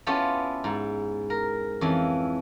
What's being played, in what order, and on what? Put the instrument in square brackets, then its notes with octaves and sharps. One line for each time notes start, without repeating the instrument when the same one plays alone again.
[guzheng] B3 C#4 E4 F4 G4 A4
G#2
A#4
F2 E3 C#4